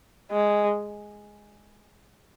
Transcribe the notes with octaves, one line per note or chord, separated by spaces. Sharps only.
G#3